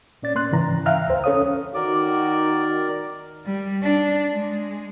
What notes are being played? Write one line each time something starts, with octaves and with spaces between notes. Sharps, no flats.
A#2 C#4 D5 A6
A#3 C6 F#6
G#2 C#3 E3 A#5
E5 F5 G5 A#5 F6 F#6
D2 C5
C#4 A4 C#5 F5 D#6
D#3 F#4 A#4 D5 D6
G3
D4
G#3